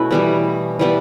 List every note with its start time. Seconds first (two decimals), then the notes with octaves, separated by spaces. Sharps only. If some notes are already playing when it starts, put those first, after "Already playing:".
Already playing: B2 A3 C#4 E4 A4 B4
0.11 E3 G3 B3
0.79 E3 G3 B3